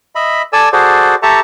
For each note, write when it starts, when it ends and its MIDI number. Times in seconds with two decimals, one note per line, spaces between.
0.15 0.42 75
0.15 0.42 76
0.15 0.42 83
0.53 0.69 69
0.53 0.69 74
0.53 0.69 80
0.53 0.69 88
0.73 1.15 66
0.73 1.15 68
0.73 1.15 69
0.73 1.15 72
0.73 1.15 74
1.23 1.40 67
1.23 1.40 69
1.23 1.40 76
1.23 1.40 81
1.23 1.40 82
1.23 1.40 85